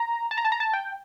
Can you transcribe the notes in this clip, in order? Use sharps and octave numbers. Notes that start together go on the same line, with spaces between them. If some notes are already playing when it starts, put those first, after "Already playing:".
Already playing: A#5
A5
A#5
A5
A#5
A5
G5